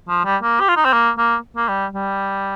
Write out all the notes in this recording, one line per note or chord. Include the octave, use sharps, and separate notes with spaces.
F3
G3
A#3
G4
F4
D#4
C4
A#3
A#3
A#3
G3
G3